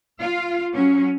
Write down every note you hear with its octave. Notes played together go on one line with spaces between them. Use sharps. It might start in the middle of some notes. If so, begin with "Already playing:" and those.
F4 F5
F#3 C#4